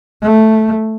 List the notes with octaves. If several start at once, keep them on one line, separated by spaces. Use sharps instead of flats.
A3